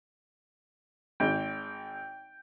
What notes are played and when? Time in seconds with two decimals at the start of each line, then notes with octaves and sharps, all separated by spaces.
1.20 G#1 G5